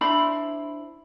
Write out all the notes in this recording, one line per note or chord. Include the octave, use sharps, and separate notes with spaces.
D4 E4 C5 B5